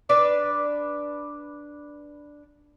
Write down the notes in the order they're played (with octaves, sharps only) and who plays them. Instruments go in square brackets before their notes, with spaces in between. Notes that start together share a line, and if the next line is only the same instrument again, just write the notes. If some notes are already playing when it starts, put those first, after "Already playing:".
[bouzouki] D4 B4 D5